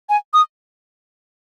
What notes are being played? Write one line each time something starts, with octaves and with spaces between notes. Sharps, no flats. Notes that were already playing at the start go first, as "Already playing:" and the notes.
G#5
D#6